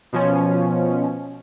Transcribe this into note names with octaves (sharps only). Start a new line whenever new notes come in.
B2 F3 C#4